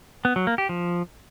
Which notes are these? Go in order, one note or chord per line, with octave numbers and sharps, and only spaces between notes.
B3
F#3
A#3
G4
F3